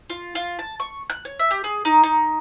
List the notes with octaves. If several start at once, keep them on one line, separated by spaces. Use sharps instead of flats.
F4
F4
A5
C#6
F#6
C#5
E5
G4
G#4
D#4
D#4